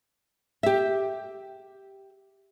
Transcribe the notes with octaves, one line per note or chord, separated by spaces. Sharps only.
G4 E5